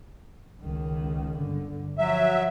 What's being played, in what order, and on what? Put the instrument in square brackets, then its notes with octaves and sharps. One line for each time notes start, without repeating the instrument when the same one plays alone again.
[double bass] C#2 D#3
G1 D3
[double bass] F3 [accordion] F#3 E5